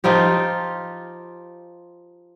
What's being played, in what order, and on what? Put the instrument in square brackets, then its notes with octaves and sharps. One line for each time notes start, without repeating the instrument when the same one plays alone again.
[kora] F3 D#4 F4 G4